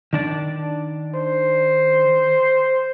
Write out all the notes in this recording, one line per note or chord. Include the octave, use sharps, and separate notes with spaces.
D#3 D4 D5
C5